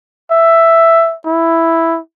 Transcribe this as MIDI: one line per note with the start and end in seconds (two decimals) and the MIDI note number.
0.31 1.15 76
1.26 1.99 64